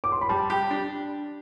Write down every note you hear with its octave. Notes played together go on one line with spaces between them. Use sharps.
D6
C6
B5
G3 A5
G4
D4